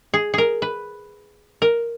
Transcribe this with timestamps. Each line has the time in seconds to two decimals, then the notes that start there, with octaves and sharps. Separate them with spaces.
0.14 G#4
0.34 G#4 A#4
0.62 B4
1.62 A#4